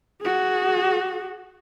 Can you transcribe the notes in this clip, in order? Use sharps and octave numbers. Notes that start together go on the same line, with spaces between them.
F#4 G#4